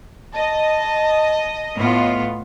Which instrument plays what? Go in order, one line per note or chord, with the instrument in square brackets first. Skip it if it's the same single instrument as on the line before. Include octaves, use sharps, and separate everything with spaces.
[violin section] D#5 [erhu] A5
[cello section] A2 B3 F4